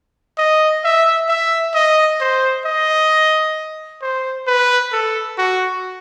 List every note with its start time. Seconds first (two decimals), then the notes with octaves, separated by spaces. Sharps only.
0.38 D#5
0.84 E5
1.29 E5
1.75 D#5
2.20 C5
2.66 D#5
4.02 C5
4.47 B4
4.92 A4
5.38 F#4